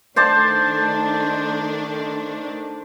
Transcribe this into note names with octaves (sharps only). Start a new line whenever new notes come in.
D#3 A3 D4 C5 D5 A5